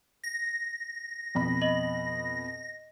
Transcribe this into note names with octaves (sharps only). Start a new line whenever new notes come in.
A#6
F2 B2 B5
D#5 F#7